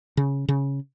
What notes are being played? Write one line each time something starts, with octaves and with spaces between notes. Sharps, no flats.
C#3
C#3